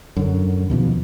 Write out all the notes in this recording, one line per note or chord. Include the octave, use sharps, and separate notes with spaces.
F#2 D3
D#2 B2 F3